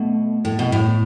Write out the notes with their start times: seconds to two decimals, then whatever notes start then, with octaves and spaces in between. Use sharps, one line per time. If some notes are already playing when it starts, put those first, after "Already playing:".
Already playing: B2 A3
0.45 A2
0.59 B2
0.72 A2